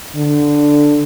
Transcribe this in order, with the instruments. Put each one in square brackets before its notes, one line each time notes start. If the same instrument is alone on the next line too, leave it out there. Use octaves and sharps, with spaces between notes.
[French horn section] D3